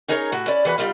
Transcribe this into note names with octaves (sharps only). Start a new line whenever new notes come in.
C#4 D#4 G#4 A#4 B4 C#5
A2 F#4
C#4 E4 D5
B2 E3 G#3 F#4 B4 G#5
B2 F3 G3 D#4 F4